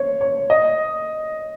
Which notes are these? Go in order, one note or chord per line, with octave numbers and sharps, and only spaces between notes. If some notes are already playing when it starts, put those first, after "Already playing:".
Already playing: C5 C#5
C#5
D#5